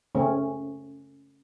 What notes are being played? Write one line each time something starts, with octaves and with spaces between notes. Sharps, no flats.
C#3 A3 C4 C#4